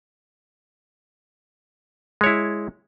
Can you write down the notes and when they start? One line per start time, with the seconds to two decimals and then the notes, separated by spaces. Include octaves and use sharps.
2.21 G#3
2.24 C#5
2.26 E4